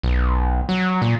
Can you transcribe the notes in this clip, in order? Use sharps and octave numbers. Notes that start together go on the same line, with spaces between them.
B1
F#3
A#2